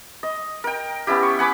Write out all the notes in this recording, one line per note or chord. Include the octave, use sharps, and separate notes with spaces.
D#5
A#4 G5
B3 C#4 E4 G4
C#6
F#5 G#5 B5 D6